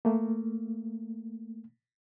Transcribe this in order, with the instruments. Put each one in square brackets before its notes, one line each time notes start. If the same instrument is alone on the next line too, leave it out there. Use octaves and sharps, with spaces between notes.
[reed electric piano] A3 A#3